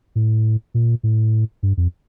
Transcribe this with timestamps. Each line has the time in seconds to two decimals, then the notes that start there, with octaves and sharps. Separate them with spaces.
0.15 A2
0.74 A#2
1.03 A2
1.63 G2
1.77 F2